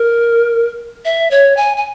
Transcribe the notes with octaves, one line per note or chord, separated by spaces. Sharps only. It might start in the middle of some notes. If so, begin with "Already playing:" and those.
Already playing: A#4
E5
C#5
G#5
G#5